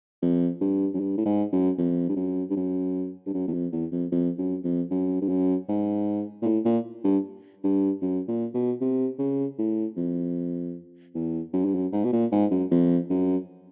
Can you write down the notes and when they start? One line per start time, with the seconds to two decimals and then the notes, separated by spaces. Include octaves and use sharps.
0.22 F2
0.61 G2
0.94 F#2
1.00 G2
1.18 A2
1.26 G#2
1.52 F#2
1.78 F2
2.09 G2
2.16 F#2
2.50 G2
2.56 F#2
3.27 G2
3.34 F#2
3.48 E2
3.53 F2
3.72 E2
3.92 F2
4.12 F2
4.38 F#2
4.64 F2
4.91 F#2
5.22 G2
5.29 F#2
5.69 G#2
6.42 A#2
6.45 A2
6.65 A#2
7.04 G2
7.64 G2
8.02 F#2
8.28 A#2
8.54 B2
8.81 C3
9.19 C#3
9.59 A2
9.97 F2
11.15 E2
11.53 F#2
11.65 G2
11.75 F#2
11.92 G#2
12.04 B2
12.12 A#2
12.32 G#2
12.51 F#2
12.71 F2
13.10 F#2